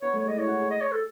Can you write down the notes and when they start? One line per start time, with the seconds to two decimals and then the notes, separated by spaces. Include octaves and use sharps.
0.02 B3 C#5
0.13 A3
0.19 C#5
0.25 G#3
0.28 D#5
0.36 E4 C#5
0.47 F#4
0.59 G#4
0.71 D#5
0.81 C#5
0.92 A4